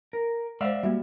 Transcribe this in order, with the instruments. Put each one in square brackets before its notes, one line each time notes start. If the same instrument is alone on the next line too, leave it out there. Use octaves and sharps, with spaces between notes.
[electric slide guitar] A#4
[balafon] G#3 C5 [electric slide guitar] D5 E5 F5
[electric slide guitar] G3 [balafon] A#3 F#4 E5